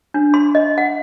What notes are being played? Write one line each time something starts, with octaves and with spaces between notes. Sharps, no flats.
D4
C6
D#5
F#5